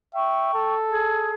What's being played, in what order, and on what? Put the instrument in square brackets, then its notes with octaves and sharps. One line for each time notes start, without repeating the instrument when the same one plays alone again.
[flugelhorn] E5 [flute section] G5 C#6
[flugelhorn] A4
[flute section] G#4